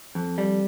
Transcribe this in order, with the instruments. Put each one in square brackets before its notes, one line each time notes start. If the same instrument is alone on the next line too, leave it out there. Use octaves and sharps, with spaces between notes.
[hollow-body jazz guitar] F2
G3